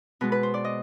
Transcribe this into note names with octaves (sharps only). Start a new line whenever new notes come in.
B2 G#3 B3 B4
B4
C5
D5
D#5